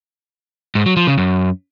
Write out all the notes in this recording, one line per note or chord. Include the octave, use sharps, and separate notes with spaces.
G#2
F#3
F3
C#3
F#2